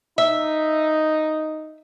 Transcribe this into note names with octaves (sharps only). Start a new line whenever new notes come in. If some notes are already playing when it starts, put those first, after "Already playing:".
D#4 E5